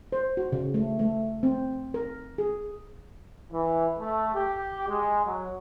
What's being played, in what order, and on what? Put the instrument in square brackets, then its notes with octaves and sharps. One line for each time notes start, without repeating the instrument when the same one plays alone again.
[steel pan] C5
F#4
C#3
A3
A3
C4
A#4
G#4
[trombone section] E3
A3
G4
G#3
F#3